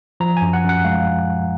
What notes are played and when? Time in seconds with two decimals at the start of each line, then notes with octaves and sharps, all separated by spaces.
0.20 F3 A#5
0.37 G#5
0.42 F#2
0.53 F#5
0.64 F#2
0.69 F#5
0.85 G#3 F5